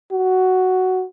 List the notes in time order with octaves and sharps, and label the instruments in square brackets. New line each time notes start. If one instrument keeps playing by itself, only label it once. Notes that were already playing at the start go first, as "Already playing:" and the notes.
[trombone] F#4